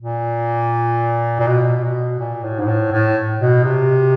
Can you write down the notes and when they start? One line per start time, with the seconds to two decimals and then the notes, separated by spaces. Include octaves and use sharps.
0.01 A#2
1.40 A#2
1.47 B2
1.83 B2
2.19 A#2
2.43 A2
2.59 G#2
2.68 A2
2.92 A2
3.40 B2
3.64 C3